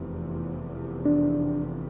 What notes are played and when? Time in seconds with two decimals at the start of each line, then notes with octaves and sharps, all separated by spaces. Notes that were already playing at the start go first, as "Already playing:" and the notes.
Already playing: F1 E2 C3
1.05 D4